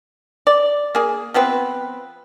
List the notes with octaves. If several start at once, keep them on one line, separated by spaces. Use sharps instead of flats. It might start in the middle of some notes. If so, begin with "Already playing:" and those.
D5
A#3 G#4
F3 B3 C4 B4